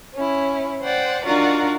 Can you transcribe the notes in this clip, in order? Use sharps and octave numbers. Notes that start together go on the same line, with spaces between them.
C#4 E4
C5 D5 F#5 G5
D4 D#4 F4 F#4 A#4 D5